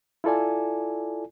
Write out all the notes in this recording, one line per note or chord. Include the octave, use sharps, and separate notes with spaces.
E4 F4 A4 D5 G#5